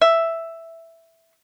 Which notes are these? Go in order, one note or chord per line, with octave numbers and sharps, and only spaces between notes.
E5